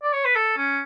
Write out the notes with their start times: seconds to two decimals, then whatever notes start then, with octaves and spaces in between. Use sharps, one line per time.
0.03 D5
0.13 C#5
0.25 B4
0.35 A4
0.57 C#4